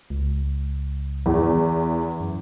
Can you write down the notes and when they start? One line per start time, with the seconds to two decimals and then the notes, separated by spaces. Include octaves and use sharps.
0.10 C#2
1.26 E2
1.42 E3
2.20 F#2